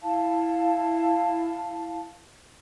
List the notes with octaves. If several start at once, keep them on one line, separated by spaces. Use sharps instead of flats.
E4 F5 A5